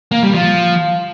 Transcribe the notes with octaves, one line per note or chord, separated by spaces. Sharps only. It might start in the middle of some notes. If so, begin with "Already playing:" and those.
A#3
G3
F3